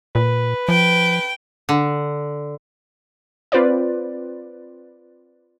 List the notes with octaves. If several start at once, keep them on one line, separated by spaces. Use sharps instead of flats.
A#2 B4
F3 G5
D3
C4 F4 B4 C5 D5